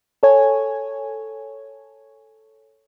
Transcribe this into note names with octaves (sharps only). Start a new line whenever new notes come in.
A4 C#5 G#5